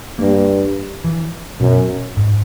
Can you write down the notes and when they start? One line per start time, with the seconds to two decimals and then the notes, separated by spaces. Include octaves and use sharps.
0.19 G2 A#3
1.04 E3
1.60 F#2 B2
2.17 G#2